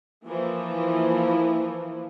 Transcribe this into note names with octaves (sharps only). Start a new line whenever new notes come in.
E3 F3 A#3 E4